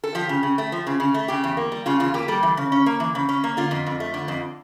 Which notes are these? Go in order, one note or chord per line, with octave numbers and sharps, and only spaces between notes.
A4
F3 G4
C#3
C#3
A3
F3
C#3
C#3
A3
C#3 G4
E2
A#3
G3
C#3 F4
E2 F4
A#3 G4
G3 A4
E3
C#3
C#4
A#3
E3
C#3
C#4
A#3
D3 F4
F2
F2
A3
D3
F2